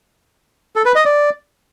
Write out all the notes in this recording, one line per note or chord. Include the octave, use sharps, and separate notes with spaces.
A4
B4
D#5
D5